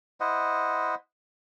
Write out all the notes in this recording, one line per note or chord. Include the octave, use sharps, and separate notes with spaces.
E4 C5 D#5 F#5